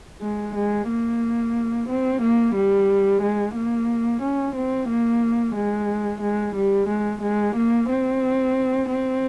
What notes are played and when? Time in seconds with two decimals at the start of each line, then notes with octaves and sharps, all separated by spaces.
0.22 G#3
0.55 G#3
0.88 A#3
1.89 C4
2.22 A#3
2.55 G3
3.22 G#3
3.56 A#3
4.22 C#4
4.55 C4
4.88 A#3
5.55 G#3
6.21 G#3
6.56 G3
6.88 G#3
7.22 G#3
7.56 A#3
7.89 C4
8.89 C4